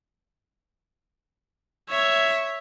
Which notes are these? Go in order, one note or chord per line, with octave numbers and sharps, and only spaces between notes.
C#5 E5